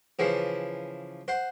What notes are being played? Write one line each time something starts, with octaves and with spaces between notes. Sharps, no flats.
C#3 E3 F3
C5 F#5